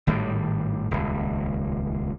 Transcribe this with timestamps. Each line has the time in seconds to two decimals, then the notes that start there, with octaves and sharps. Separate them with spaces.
0.07 G#1 A2 D#3 G3
0.91 D#1 C#2